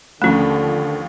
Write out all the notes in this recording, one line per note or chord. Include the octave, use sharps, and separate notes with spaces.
D#2 D3 F3 A3 C#4 B5